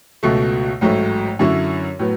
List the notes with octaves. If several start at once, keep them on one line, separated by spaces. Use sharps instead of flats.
C#2 B2 A3
A1 G#2 F#3 A3
F#2 D3 F#3 C#4 E4
A2 F#3 B3